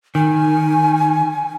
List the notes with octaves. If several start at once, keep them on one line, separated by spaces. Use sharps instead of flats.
D#3 G#5